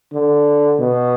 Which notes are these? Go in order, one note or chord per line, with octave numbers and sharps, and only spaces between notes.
D3
B2